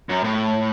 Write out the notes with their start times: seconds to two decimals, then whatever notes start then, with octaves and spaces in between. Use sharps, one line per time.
0.09 F#2
0.24 A2